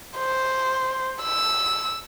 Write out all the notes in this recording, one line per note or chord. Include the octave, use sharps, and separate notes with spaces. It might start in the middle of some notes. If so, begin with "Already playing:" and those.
C5
E6